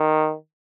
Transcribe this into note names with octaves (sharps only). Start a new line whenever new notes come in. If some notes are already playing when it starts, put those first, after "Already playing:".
Already playing: D#3